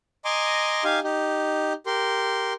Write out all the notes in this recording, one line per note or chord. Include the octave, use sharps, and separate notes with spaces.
D#5 G#5 A#5 C6 D6
D#4 G4 F5 G#5
D#4 G4
G4 A#4 C6